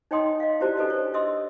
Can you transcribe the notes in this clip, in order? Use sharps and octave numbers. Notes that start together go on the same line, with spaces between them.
D#4 C#5 D#5 G5 C6 D#6
D#5 F5
E4 F#4 G4 C5 D5 A5
D4 G4 A4 B4 C5 D#5
C#5
D#5 E5 C6 D#6 E6